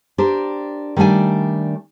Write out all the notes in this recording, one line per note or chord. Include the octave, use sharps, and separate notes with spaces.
D4 G4 A#4 C5
D#3 G3 A3 D4 G#5